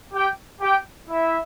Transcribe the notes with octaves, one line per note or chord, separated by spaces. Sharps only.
G4 G5
G4 G5
E4 E5